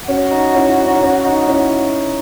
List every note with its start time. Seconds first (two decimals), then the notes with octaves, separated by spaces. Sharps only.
0.08 C#4 F#4
0.31 D#4
0.55 C#4 E4
0.66 D#4
0.85 C#4
0.90 D#4
1.02 C#4
1.25 D#4
1.48 C#4 E4